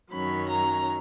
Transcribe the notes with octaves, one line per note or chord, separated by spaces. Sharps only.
F#2 D#3 F#3 C#4 B5
A#5